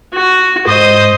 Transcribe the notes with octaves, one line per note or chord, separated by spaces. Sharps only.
F#4
G#2 C5 D#5 D#6